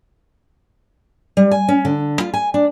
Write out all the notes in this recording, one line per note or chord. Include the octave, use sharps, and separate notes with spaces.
G3
G#5
C#4
D3
F4
G#5
D4